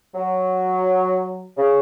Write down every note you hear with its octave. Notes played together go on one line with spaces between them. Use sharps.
F#3
C#3